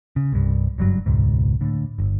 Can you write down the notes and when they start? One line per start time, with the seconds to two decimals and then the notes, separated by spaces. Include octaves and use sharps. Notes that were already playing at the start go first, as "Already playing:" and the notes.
0.16 C#3
0.32 C2 G2
0.78 F#1 G2 F#3
1.06 E1 C#2 G#2
1.61 A2 D3
1.98 G1